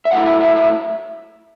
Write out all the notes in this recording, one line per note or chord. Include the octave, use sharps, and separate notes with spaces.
E5
B1 A2 F#3 A3 E4 F#5
E5
E5
E5